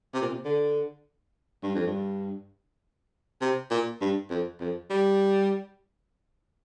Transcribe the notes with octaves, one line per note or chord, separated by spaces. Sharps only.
C3
A#2
C3
D3
G2
F2
G2
C3
A#2
G2
F2
F2
G3